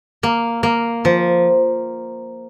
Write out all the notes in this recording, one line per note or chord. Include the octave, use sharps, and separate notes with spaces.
A#3
A#3
F3